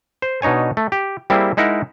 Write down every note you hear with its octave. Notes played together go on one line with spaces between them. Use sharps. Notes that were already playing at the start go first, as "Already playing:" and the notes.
C5
B2 D4 D#4 C#5 G#5
A3
G4
G3 A#3 C4 E4 G#4
G#3 D#4 E4 A#4 F#5